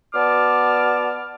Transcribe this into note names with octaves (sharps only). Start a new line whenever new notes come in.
B3 F#4 D5 A5 D6 F6